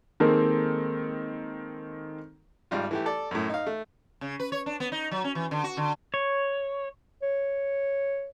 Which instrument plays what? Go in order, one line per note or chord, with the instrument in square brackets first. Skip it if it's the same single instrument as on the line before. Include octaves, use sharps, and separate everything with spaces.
[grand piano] D#3 G#3 A#3 C4 A4 A#4
[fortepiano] G#1 G3 F4
E3 A3 G4
A4 D5
F#2 A2
D#4 F5
A3
[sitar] C#3
B4
C#5
D4
B3
D#4
F#3
C#4
E3
D3
F#4
D3
[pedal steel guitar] C#5
[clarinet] C#5